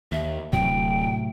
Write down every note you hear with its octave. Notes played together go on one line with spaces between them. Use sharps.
D#2 E5
D1 A2 C3 F#3 G5